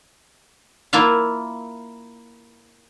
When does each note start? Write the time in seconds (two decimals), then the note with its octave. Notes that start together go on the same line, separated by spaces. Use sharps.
0.93 A#3 E4 F4 E5 F5